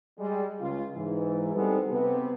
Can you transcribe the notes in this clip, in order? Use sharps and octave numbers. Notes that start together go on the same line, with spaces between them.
G3 G#3
C#2 F4
G#2 E3
G3 G#3 B3 C4 D#4 A4
C3 B3